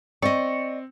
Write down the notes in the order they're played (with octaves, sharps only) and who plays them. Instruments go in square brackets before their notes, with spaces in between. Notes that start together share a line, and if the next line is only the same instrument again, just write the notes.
[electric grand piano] C4 [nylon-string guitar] D5 D#5 [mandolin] C#6